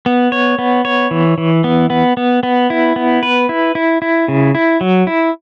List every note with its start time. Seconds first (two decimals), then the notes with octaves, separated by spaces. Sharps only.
0.06 B3
0.32 C#5
0.59 B3
0.85 C#5
1.11 E3
1.38 E3
1.64 B3
1.90 B3
2.17 B3
2.43 B3
2.70 E4
2.96 B3
3.23 B4
3.49 E4
3.75 E4
4.02 E4
4.28 C#3
4.55 E4
4.81 F#3
5.07 E4